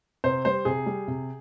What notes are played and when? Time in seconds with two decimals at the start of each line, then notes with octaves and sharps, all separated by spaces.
0.24 C3 C5
0.45 G3 C5
0.65 C3 G#4
0.86 G3
1.08 C3